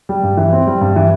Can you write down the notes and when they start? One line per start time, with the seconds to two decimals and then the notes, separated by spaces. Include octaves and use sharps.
0.09 G3
0.23 G2
0.37 E3
0.53 C4
0.67 G3
0.81 G2
0.96 E3